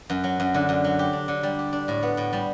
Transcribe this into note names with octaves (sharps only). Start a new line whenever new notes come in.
F#2
F#3
F#2
D3
F#2
F#3
G4
D4
D3
G3
G4
D4
A2
B3
A2
G3